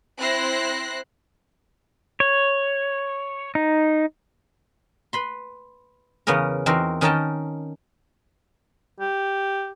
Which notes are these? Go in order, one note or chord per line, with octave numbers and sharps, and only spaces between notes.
C4 E4 C5 F#6 A#6 C7
C#5
D#4
B4 B5 C6
E2 C#3 B3 C#4 A#4
E2 C4 D#4 F#4 A#4
D#3 C#4 D#4 A#4 G5 A5
G4